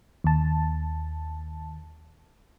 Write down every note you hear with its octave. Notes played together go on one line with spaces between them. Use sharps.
D#2 A5